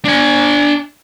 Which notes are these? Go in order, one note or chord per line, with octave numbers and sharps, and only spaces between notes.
D4 G#5